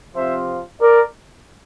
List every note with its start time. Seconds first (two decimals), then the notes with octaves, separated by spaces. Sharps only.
0.15 C3 F3 C4 F4 C5 E5
0.81 A#4 D5